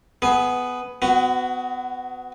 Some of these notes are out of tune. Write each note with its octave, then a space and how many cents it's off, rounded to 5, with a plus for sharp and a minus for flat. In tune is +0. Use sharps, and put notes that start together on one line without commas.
B3 +10 G#4 +25
B3 +35 F#4 +0